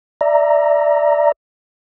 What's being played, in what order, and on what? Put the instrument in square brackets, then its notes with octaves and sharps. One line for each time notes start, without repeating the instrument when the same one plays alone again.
[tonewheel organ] D5 E5 A#5